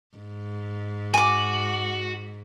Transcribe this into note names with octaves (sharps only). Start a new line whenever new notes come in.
G#2
F#4 G#5 D6